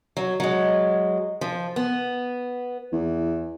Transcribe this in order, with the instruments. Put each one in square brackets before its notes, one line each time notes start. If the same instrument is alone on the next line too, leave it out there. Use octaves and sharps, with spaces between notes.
[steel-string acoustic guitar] F#3
F#3 G#3
F3
B3
[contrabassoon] E2